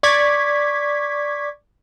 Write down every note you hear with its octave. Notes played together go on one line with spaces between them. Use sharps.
D5 C#6 D6 G#6 B6